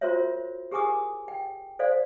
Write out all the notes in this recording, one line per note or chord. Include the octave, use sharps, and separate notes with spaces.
F4 F#4 A#4 C5 C#5 E5
G4 G#4 A#4 G#5 D6 D#6
G5
A4 C5 D5 F5